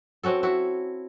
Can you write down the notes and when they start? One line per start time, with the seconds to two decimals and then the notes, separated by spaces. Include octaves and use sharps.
0.24 C4 C#4 F#4 A4
0.43 E4 F#4